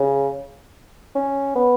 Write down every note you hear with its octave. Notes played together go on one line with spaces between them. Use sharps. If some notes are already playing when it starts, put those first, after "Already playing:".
Already playing: C#3
C#4
B3